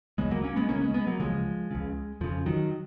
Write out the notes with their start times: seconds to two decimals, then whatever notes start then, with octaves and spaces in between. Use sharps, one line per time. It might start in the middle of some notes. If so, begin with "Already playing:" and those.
0.18 C#2 C#3 G#3 B3
0.31 F#3 A#3
0.44 A#3 C#4
0.56 G#3 B3
0.69 C#2 C#3 A#3 C#4
0.82 G#3 B3
0.94 G#3 B3
1.07 F#3 A#3
1.19 C#2 C#3 F3 G#3
1.71 C#2 C#3
2.21 F2 C#3 F3
2.46 D#3 F#3